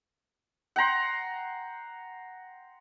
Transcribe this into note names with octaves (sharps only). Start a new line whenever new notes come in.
F#5 G5 A#5 C6